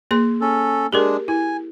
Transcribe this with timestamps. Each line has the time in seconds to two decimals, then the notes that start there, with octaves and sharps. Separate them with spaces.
0.11 A#3 G#4 C6
0.41 C#4 A4
0.93 G#3 D4 G4 G#4 A#4
1.28 E4 G#5